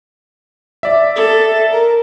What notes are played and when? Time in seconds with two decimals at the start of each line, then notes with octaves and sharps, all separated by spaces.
0.83 D5 E5
1.16 A4
1.71 A#4